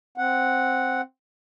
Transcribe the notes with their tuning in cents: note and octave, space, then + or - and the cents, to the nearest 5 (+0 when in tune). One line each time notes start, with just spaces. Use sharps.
C4 +0 F#5 +0